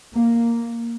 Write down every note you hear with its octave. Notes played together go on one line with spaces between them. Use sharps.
A#3